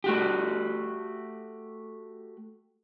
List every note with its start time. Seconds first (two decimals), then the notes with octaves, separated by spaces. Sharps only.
0.04 A3 F#4 G4